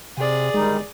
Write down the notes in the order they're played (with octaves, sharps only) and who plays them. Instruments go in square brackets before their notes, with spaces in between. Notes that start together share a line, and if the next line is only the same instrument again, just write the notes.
[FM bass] C3 [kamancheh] G#4 D5
[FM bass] G1 [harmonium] D#3 G3 D#4 [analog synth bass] G#3